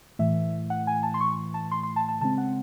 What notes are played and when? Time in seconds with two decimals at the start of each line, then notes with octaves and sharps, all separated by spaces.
0.19 A2 E3 A3 E5
0.70 F#5
0.87 G#5
1.03 A5
1.14 C6
1.20 C#6
1.54 A5
1.71 C6
1.83 C6
1.96 A5
2.08 A5
2.21 C#3 G#3 C4 A5
2.38 F#5